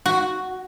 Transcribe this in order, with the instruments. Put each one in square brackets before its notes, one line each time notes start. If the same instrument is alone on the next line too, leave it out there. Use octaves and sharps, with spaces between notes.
[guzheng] F#4